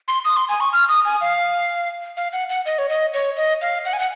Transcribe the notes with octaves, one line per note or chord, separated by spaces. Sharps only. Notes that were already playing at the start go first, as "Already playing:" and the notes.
C6
D#6
C6
G#5
C#6
F6
D#6
G#5
F5
F5
F#5
F#5
D#5
C#5
D#5
C#5
D#5
F5
F#5
G#5
F#5